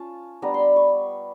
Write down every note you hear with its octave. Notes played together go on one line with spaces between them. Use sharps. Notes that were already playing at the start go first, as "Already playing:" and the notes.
Already playing: C#4 F4 A5
G3 B3 D4 A#5
C6
B5
C#6